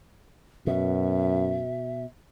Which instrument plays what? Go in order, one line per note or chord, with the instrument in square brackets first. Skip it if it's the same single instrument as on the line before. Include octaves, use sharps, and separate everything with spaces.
[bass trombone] F#2 [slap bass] B2 [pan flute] E5